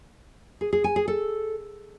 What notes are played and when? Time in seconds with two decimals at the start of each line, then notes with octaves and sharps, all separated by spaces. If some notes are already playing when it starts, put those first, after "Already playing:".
0.61 G#4
0.73 G#4
0.84 G#5
0.96 G#4
1.08 A4